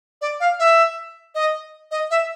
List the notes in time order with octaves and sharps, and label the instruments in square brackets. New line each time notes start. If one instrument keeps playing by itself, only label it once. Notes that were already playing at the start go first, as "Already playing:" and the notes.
[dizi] D5
F5
E5
D#5
D#5
E5